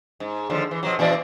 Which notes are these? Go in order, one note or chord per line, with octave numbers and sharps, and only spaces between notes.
G#2
D#2 D3 F3
E3
B2 F3 F#3
A#2 E3 D5